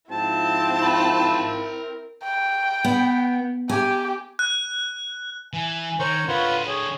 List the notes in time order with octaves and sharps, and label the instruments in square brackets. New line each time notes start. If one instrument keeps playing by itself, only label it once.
[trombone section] G#2 F3 F4 [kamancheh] C4 E4 [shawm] A5
[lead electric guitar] A#4 B5
[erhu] G5
[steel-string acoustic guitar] B3
[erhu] G4 [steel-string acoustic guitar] G#5
[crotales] F#6
[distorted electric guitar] E3 [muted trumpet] G#5
[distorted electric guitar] D#3 [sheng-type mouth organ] A#4 C5 C#6 [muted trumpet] C#5
[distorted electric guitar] D3 D#5 [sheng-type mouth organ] F4 B4 F#5
[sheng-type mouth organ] G#4 [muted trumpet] C#5